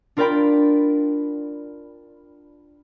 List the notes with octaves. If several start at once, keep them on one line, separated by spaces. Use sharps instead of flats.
D4 F4 A#4 D5 G5 B5